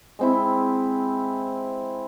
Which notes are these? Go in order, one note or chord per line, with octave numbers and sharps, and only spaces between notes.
G#3 C4 E4